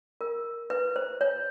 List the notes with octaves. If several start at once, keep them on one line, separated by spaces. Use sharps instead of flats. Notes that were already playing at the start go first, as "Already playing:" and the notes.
A#4
B4
C5
C#5